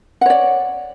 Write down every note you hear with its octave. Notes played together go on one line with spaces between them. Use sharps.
C#5 D5 F#5